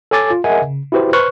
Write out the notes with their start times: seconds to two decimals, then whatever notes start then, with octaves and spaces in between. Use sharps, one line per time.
0.11 A4 C#5 G#5 D6 A6
0.30 F4
0.44 G#4 A#4 D#5 E5 F#5 G#5
0.62 C#3
0.92 E4 F#4 G4 B4 C5
1.13 B4 C5 C#6 F6 F#6